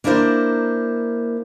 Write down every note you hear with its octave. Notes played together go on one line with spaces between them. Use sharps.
A#3 D4 E4 A#4 C5